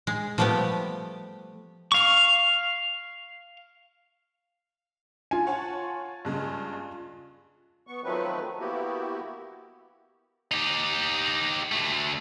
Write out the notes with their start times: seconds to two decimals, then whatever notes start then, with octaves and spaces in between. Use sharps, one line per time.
0.07 G#3
0.38 F3 G3 A3 B3 G4
1.92 F5 C#6
5.31 F4 G#5
5.47 C#5 F#5 A5
6.25 G2 C#3 G#3
7.87 B3 C#6
8.04 D#3 F3 F#3 A3 C4 B4
8.59 A#3 B3 E4 F#4 G4
10.52 D#4 G4
11.72 D2 A3